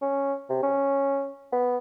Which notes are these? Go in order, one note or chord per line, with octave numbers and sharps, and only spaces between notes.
C#4
C3
C#4
B3